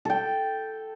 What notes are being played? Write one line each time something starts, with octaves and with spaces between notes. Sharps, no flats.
A4 G5